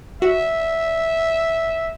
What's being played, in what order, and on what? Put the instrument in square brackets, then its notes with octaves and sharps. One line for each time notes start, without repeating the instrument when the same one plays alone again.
[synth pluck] F#4 [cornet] E5